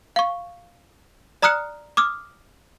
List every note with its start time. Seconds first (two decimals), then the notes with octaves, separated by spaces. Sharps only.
0.16 F5 C#6
1.42 D5 A#5 D#6 F6 F#6 C#7
1.97 D6 D#6 F6